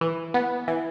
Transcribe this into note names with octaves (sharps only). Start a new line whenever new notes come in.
E3
B3
E3